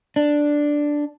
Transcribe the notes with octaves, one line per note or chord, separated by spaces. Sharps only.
D4